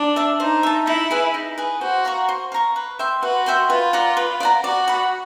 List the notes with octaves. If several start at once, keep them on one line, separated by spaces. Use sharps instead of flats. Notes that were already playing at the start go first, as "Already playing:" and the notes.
Already playing: D4
E5 A5
D#4 C5
E5 A5
D#4 E4
G#4 B4
D#4
G#4 B4
F#4 C5
F5 A#5 C#6
C5
F5 A#5 C#6
B4
E5 G5 C6
F#4 B4
E5 G5 C6
F4 B4
D5 F#5 A#5
B4
D5 F#5 A#5
F#4 D5
F#5 B5